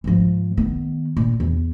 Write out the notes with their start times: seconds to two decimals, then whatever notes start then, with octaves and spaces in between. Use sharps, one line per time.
0.04 G#2 F3
0.57 D#3 B3
1.17 A#2
1.40 E2